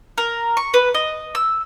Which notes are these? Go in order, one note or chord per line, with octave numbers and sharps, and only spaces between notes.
A#4
C#6
B4
D#5
E6